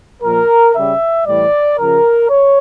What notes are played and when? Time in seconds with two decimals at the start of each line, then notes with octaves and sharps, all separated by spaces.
0.22 A#2 F3 A#4
0.74 C#3 G3 E5
1.26 A2 E3 G3 D5
1.78 C#3 F3 A#4
2.30 C#5